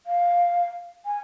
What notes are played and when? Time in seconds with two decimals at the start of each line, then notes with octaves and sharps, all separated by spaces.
0.06 F5
1.06 G#5